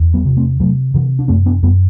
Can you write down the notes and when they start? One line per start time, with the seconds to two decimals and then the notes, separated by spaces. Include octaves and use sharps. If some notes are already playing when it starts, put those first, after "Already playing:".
Already playing: E2
0.14 G3 B3
0.25 C3
0.37 A3 C4
0.60 C3 F#3 A3
0.94 C3 E3
1.19 D4
1.28 F#2 A3 C4
1.46 B3 D4
1.63 F#2 G3 B3